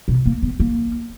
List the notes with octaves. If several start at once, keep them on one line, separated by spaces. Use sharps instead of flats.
B2
A#3
B3
A#3